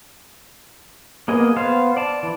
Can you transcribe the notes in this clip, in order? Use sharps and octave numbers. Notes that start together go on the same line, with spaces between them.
A#3 B3 G#4 D#5
B3 C5 F5
D5 A5
E3